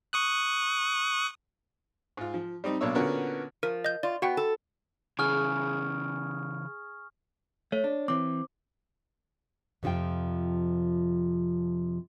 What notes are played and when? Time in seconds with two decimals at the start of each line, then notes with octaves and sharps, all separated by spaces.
0.13 C#6 D#6 F#6
2.17 G#2 F4
2.34 F3
2.64 G3 C4 D#4
2.81 B1 B2 A#3 D4 C#5 E6
2.95 A#2 D3 B3 C#4 F#4 A#4
3.63 F3 A#4
3.85 D#5 G6
4.03 F4 D5
4.22 B3 F#4 F#5 G5
4.37 A4
5.19 C#3 E3 G#4 C#6 F6
7.72 A3 C#5
7.84 D4
8.08 E3 C4 D6
9.83 F2 C3 F3 F4 G5